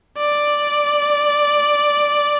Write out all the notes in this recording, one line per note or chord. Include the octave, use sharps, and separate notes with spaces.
D5